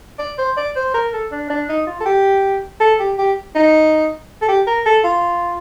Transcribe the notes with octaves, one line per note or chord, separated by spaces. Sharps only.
D5
C5
D5
C5
A#4
A4
D4
D4
D#4
F4
A4
G4
A4
G4
G4
D#4
A4
G4
A#4
A4
F4